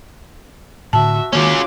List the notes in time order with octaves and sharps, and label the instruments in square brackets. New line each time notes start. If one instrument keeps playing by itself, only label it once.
[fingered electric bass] A2 D3 [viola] F#4 E5 [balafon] A5
[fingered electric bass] D#3 A#3 [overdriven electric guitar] C#4 F4 [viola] F#4 D6